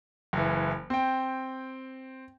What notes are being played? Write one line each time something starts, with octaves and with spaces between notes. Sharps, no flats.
F#1 E3
C4 G5